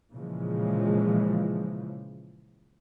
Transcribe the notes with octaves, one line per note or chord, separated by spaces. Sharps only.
A#2 C#3 E3 F3 G#3